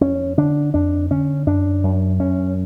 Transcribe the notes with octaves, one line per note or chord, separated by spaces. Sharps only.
F2 C#4
D3 D4
F2 D4
D3 C#4
F#2 D4
F#2
F#2 C#4